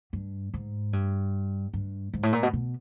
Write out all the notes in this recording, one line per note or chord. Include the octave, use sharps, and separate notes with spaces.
G2
G#2
G2
G2
G#2
A2
A#2
B2
B2